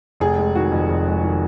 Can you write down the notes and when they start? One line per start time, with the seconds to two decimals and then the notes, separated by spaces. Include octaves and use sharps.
0.20 F1 G#4
0.38 G#3
0.55 D#3 F#4
0.72 F2
0.90 F1
1.07 G#3
1.24 D#3